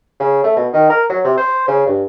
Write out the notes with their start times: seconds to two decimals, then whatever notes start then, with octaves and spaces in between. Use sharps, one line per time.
0.20 C#3
0.44 A3
0.56 B2
0.73 D#3
0.90 A#4
1.09 F#3
1.24 C3
1.38 C5
1.68 C#3
1.87 G2